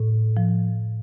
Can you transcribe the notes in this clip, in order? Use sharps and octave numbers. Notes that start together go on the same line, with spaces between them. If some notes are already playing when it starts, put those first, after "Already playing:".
Already playing: A2
F3